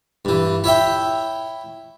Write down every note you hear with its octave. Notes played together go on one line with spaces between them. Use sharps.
G2 E3
E4 C#5 E5 G5